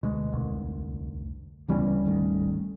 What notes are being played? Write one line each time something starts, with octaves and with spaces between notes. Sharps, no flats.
D2 B2 G#3
F1 C2
D1 C#3 E3 G3 B3 C#4
G#1 D#3 A3